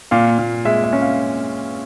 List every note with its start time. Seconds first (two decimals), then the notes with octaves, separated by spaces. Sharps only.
0.11 A#2 F5
0.39 A#2
0.65 G#3 E5
0.84 E5
0.93 C#4
1.02 F5